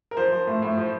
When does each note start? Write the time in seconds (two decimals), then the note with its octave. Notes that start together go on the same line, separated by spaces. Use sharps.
0.11 A#4
0.17 F3 C5
0.32 F3
0.47 A2
0.62 A2
0.77 F3